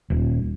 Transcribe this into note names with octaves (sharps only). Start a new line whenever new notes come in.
D#1